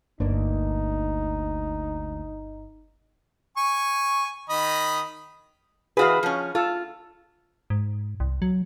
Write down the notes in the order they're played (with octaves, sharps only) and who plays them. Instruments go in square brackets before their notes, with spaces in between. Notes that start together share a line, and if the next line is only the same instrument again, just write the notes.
[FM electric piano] G1 [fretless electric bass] D2 A#3 D4 [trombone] D#4
[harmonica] G#5 C#6
D#3 D#5 B5
[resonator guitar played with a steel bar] E3 F#4 B4 [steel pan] G#4 F5
[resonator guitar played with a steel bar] F3 C#4
[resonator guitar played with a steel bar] F4 [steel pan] A4
[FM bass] G#2
C2
F#3